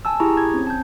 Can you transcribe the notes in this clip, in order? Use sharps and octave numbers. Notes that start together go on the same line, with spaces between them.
G#5 A5 E6
E4 G4 G#4 A#5 C#6
G#6
C4 C#4
A5 G6